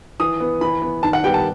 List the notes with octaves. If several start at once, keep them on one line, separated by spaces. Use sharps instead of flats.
E3 D#6
B3
E3 B5
B3
D#3 A5
F#5
G3 B3 G5
A5